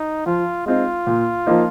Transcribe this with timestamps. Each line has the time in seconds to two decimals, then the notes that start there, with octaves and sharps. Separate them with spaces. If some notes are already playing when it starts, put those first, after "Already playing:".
Already playing: D#4
0.26 F3 F4
0.66 G#3 C4 D#4 F4
1.07 A#2
1.46 F3 A#3 D#4